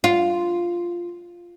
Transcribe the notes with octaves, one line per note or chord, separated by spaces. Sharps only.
F4